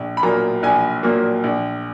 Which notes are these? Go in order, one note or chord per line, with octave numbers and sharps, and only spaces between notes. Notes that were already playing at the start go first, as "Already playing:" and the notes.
Already playing: A#1
B5
A#2 F#3 A#3 A#5
A#1 G#5
A#2 F#3 A#3
A#1